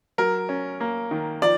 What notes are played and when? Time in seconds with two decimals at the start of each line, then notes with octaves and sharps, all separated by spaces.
0.18 F#3 A#4
0.49 C#4
0.80 A#3
1.11 D#3
1.42 F3 D5